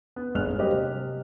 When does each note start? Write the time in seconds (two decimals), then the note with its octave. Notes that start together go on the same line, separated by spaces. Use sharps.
0.16 B3
0.35 G1 G#2 G#4 F6 F#6 F7
0.58 F#3 G3 A#3 C4 G4 D#5
0.71 C3